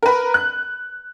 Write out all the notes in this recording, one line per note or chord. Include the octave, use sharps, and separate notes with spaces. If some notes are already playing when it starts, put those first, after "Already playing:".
A#4 B4
F#6